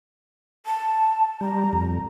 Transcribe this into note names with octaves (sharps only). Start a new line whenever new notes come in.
A5
G3 A#5
F2